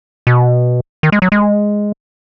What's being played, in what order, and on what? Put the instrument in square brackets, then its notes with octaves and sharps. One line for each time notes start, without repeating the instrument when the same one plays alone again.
[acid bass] B2
D#3
G#3
F#3
G#3